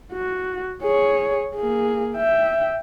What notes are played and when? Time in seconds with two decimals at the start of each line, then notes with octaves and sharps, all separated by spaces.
0.13 F#4
0.83 G#4 C#5
1.56 A#3 G#4
2.16 E5 G5